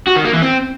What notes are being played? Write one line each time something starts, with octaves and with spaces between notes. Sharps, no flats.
F#4
D#3
A#3
E3
C4